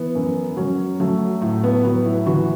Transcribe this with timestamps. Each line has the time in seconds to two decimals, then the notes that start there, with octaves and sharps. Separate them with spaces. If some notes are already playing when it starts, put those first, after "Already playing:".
Already playing: E3 B3
0.15 F#2
0.57 F#3 C#4
1.00 F#3 A3
1.42 A2 A3
1.64 B3
1.85 F#3 B3
2.05 E4
2.26 E3 F#4